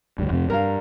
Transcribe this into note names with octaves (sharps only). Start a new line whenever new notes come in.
D2 G2
F2 C3
G2 A#4 F5